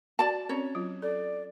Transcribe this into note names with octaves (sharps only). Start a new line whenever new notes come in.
F#4 D5 A5
C4 C#4 C#5
F#3 F4
A4 D5